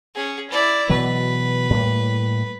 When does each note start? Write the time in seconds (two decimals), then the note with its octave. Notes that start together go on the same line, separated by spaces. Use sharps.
0.15 C#4 G#4
0.50 E4 D5
0.89 B2 E3 F#3 B4
1.70 A2 G3 A#3